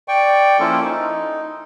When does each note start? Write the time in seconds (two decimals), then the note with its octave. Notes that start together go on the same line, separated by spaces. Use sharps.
0.08 D5 G5 C#6
0.60 F3 A#3 C#4 E4 F4 A4
0.84 D#4